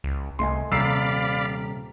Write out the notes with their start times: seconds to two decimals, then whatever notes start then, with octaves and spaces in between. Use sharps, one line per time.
0.04 C#2
0.39 C2 A3 D#5 G#5 C6
0.72 D#1 C3 D5 F5 A#5 B5 E6 C7